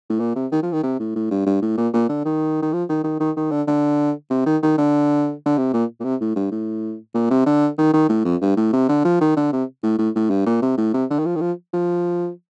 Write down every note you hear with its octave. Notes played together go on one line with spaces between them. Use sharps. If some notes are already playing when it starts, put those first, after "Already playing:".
A2
A#2
C3
D#3
F3
D#3
C3
A2
A2
G2
G2
A2
A#2
A#2
D3
D#3
D#3
F3
D#3
D#3
D#3
D#3
D3
D3
C3
D#3
D#3
D3
D3
C3
A#2
A#2
C3
A2
G2
A2
A#2
C3
D3
D#3
D#3
A2
F2
G2
A2
C3
D3
F3
D#3
D3
C3
A2
A2
A2
G2
A#2
C3
A2
C3
D3
D#3
F3
D#3
F3
F3